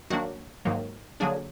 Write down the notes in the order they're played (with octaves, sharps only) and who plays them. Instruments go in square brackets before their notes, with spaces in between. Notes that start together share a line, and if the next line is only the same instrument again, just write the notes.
[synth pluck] D#3 F#3 A#3 D4 F#4
G#2 D#3 F#3 A#3
D3 F#3 A#3 D4 G#4